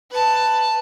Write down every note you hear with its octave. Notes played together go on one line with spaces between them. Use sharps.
B4 A5